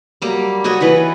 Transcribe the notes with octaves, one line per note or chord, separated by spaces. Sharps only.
F#3 G3 A#3
F#4 A4 C#5 D#5
E3 B4 D#5